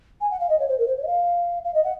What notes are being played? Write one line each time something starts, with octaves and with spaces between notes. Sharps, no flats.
G#5
F#5
F5
D#5
C#5
C5
A#4
C5
C#5
D#5
F5
F5
D#5
F#5